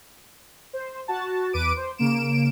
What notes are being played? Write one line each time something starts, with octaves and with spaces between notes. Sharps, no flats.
C5
F#4 A5
E2 B4 D6 D7 D#7
C5
C#3 A#3 D7 E7